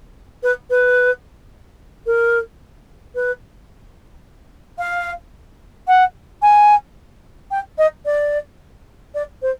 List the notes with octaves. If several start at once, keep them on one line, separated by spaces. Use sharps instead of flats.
B4
B4
A#4
B4
F5
F#5
G#5
G5
D#5
D5
D5
C5